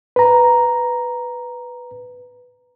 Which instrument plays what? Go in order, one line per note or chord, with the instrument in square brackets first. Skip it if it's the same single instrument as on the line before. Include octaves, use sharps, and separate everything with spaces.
[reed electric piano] B4 A#5